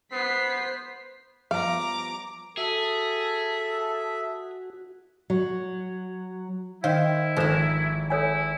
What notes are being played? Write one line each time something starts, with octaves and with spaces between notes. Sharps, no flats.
B3 C5 B6 C7
F3 G3 B3 F5 A#5 D6
F#4 G#4 A4 E5
F#3
D#3 E4 C5 F5
G#1 F3 D4 A4 A#4 C5 E7
E4 A4 C#5 G#5